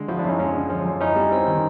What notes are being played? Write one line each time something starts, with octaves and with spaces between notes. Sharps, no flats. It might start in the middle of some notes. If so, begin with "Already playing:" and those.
Already playing: D3 G#3
F3 E4 F#4
D4 E4
F#2 C#4 D#4
G#3 C#4
D3
F3 C#4
F#2
C#4 D#4 E4
G3
C4
D#3